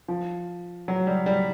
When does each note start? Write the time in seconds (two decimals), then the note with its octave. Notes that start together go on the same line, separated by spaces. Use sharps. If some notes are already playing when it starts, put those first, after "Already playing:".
0.08 F3
0.88 F#3
1.07 G3
1.26 G3